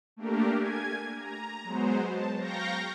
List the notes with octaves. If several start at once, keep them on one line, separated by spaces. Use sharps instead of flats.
A3 A#3 D4 G4 A#4
G#5 G#6
A#5
F#3 G#3 B3 C5
A5
F5 G5 A#5 C#6 G6 A#6